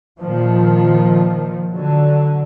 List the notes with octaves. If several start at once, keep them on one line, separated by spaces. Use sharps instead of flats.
A#2 D#3 F3
D3 F#3